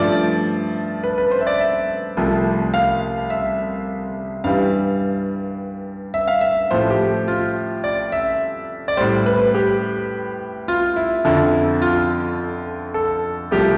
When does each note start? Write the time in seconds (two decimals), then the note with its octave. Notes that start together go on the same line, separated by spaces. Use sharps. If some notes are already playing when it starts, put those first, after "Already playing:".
Already playing: G2 F3 A3 D5
1.04 B4
1.18 B4
1.31 C5
1.41 E5
1.47 D5
1.60 E5
2.17 C2 C3 F3 A3
2.74 F5
3.30 E5
4.44 G2 E3 G3 F5
6.14 E5
6.28 F5
6.41 E5
6.71 A2 F3 A3 C5
6.90 G4
7.28 F4
7.84 D5
8.12 E5
8.88 D5
8.97 A2 G3 C5
9.26 B4
9.55 G4
10.68 F4
10.96 E4
11.25 F2 D3 F3 E4
11.82 F4
12.94 A4
13.51 C2 C3 F3 A3 G4